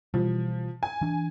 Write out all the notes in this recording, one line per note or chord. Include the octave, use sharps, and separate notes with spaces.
B2 E3 F3 G3
G#5
E3 D4